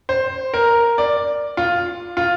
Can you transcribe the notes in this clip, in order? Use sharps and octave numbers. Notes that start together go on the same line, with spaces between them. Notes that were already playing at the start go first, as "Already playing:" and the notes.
C5
A#4
D5
F4
F4